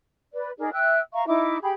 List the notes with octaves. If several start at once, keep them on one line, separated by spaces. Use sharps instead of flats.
B4 D5
D#4 G#4 A#4 D5
E5 G5 E6 F#6
E5 F5 A#5 C#6
D#4 E4 E5 D6
G4 G#4 G5 B5